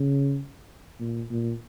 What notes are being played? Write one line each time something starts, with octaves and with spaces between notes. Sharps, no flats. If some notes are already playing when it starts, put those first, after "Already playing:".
Already playing: C#3
A#2
A#2